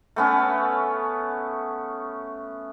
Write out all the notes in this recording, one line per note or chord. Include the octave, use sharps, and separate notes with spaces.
A3 B3 C#4